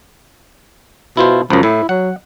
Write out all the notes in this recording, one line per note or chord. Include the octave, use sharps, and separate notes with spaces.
B2 E4 F4 C5
C#2 F#2 F3
A2 E4
F#3 F#5